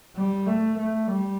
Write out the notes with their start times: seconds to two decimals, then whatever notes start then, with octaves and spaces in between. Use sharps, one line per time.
0.15 G3
0.46 A3
0.77 A3
1.08 G3